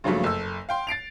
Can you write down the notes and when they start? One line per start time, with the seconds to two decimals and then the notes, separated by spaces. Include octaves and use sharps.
0.04 G2 C#3 F3 F#3 A3 A#3
0.24 F#1 A4 E6
0.69 F5 G5 C6
0.87 A6 C7 D7 F7